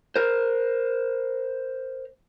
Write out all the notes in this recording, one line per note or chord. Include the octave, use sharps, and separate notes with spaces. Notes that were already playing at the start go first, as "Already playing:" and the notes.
A#4 C5